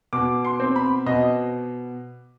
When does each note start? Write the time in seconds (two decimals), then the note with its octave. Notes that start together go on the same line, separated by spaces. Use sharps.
0.13 B2 D6
0.45 C6
0.60 C4
0.76 B5
1.06 B2 D#5